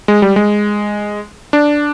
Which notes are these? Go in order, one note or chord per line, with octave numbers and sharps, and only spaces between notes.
G#3
G3
G#3
D4